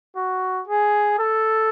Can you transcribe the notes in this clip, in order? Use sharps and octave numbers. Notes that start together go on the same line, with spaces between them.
F#4
G#4
A4